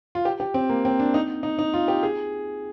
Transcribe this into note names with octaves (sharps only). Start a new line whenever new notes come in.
F4
G4
G4
C4
A#3
C4
D4
D#4
D#4
D#4
F4
G4
G#4